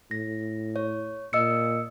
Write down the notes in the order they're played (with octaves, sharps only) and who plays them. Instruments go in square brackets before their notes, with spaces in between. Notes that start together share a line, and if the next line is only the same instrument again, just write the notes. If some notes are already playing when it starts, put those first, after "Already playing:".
[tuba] A2 [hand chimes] A#6
[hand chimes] C#5
[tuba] A#2 [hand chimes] D#5 E6 C#7